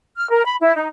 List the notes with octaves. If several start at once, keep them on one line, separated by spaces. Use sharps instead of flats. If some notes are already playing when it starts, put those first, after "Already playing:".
F6
A#4
B5
E4
D#4